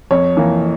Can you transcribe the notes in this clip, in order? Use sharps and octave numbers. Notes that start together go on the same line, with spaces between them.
F2 C#5
E3 A#3